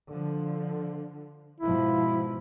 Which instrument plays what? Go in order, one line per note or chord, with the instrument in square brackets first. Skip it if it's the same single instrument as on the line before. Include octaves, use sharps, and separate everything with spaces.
[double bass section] D3 F3
[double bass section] G#2 B2 F3 [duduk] E4